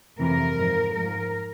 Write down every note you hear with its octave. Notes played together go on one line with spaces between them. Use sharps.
F2 C3 E3 A#4
G#2 F3
G#2 F3 A#4